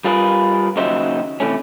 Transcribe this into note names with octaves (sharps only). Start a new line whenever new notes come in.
G3 F4 G#4 A#4 B4
D#2 C#3 F#3 D#4 C5 E5
C3 E3 A3 C#4